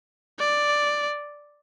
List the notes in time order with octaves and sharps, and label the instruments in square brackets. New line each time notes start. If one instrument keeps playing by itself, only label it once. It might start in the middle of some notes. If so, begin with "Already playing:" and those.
[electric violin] D5